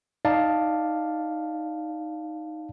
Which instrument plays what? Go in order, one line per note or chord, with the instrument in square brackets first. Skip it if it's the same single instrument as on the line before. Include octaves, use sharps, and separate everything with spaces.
[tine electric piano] D#4 D5 F5 A5